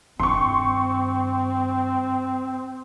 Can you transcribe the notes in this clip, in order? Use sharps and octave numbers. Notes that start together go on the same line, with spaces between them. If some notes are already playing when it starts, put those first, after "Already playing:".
G2 D#3 C4 C6 C#6